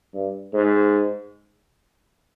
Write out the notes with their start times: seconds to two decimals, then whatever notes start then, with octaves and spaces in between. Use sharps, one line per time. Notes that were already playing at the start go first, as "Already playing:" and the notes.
0.14 G2
0.54 G#2